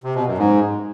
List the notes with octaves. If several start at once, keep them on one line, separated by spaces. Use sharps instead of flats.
C3
B2
F#2
G#2